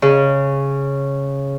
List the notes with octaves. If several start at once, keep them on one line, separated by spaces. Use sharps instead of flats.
C#3